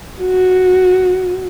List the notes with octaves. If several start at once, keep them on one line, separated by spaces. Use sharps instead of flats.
F#4